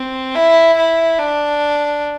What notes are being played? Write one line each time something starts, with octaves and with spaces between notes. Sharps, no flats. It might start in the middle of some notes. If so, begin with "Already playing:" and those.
Already playing: C4
E4
E4
D4